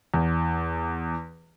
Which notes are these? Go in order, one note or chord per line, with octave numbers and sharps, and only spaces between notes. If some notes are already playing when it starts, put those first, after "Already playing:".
E2